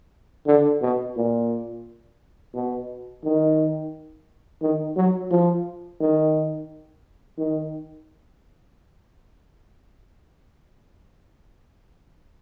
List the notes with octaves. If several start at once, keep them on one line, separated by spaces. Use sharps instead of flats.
D3
B2
A#2
B2
D#3
D#3
F#3
F3
D#3
D#3